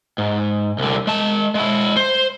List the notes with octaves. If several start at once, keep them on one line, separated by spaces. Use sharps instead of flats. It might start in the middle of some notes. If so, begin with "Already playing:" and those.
G#2
C2 D3
G#3 A5
G#3 E4
C5